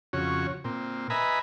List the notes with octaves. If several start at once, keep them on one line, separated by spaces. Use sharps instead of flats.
F2 C#3 F#4 C#5
A#2 C4
B4 D#5 E5 G#5 A#5 B5